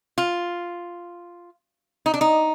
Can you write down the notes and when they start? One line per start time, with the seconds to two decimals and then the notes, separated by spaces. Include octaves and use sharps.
0.18 F4
2.06 D#4
2.14 D4
2.21 D#4